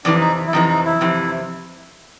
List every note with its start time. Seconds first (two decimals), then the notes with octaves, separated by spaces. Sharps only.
0.04 F2 C3 E3 D4
0.21 D#4
0.47 E4
0.53 F2 C3 E3 D#4
0.69 D#4
0.86 E4
1.01 F2 C3 E3